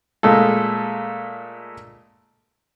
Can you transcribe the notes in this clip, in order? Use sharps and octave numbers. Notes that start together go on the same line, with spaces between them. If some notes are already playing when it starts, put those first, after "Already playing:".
A#2 G#3 A3 A4